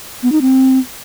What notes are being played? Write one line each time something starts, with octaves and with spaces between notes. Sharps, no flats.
B3
D#4
C4